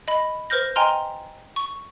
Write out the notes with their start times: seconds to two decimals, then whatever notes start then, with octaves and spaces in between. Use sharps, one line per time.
0.08 D#5 B5
0.50 B4 C5 F6 G6 A#6
0.76 D#5 G5 G#5 A#5 C6 F6
1.56 C#6